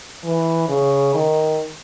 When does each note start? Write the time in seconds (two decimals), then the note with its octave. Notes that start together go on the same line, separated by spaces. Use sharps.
0.24 E3
0.68 C#3
1.14 D#3